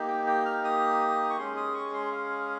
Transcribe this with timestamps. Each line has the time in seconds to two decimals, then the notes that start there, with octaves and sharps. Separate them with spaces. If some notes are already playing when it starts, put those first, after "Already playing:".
Already playing: A#3 D#4 G4
0.08 G5
0.27 G5
0.46 F6
0.64 D#6
1.30 C#6
1.38 G#3 C#4 G#4 C6
1.57 D#6
1.75 C#6
1.93 C6
2.12 F5